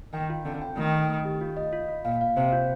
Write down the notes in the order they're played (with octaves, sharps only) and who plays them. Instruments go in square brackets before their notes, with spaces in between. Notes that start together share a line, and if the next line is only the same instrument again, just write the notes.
[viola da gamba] D#3 [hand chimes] G5
[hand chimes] F4
[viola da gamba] D3 [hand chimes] C4
[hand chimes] G5
[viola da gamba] D#3 [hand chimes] A3
[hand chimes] A3
A3
G4
F4
D#5
F4
F4
[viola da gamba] A#2 [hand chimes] F5
[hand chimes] F5
[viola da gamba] C3 [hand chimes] C5
[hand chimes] F4